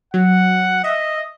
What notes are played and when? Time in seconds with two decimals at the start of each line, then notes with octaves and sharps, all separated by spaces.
0.14 F#3 F#5
0.84 D#5 E5